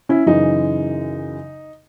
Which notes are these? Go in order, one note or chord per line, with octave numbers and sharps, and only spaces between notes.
C#4 E4
F#2 C#3 E3 D#4